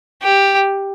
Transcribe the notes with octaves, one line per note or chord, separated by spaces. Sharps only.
G4